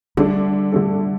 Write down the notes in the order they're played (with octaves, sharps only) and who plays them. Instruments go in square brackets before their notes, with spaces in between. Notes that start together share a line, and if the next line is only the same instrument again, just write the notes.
[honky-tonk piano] D3 A3 D4 A4 [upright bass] G3
[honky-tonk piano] D3 A3 D4 A4